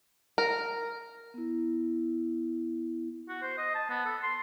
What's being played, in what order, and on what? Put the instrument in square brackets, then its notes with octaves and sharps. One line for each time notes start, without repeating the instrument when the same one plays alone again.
[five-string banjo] A#4
[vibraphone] B3 E4
[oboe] F#4
C5
D#5
A5
B3
A4
C6